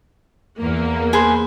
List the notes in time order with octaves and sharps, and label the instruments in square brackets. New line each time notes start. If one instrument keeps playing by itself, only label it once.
[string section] E2 A#3
[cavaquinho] G#4 B4 C5